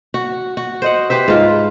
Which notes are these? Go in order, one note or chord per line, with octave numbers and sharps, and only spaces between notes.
F#4
F#4
C5 D#5 F#5
G4 B4 C5 E5
G#2 F4